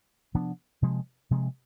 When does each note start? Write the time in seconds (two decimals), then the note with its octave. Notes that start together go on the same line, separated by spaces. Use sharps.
0.34 C3 F3 B3 D4
0.82 C3 F3 G#3
1.31 C3 F3 G#3